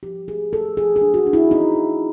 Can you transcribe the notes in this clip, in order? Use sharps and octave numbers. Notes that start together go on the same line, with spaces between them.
F3 G4
A3 G#4
A3 A4
F3 G#4
G#4
D4
F#4
D4
E4
C4 D#4
C4